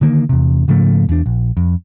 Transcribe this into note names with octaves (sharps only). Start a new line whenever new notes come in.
D3 D#3 A#3
E2 C3
G#2 C#3 F3 A3
E2 D4
A#1
F2